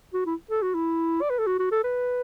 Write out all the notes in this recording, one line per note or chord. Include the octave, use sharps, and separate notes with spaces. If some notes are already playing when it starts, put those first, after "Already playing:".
F#4
E4
A4
F#4
E4
D5
B4
A4
F#4
F#4
A4
B4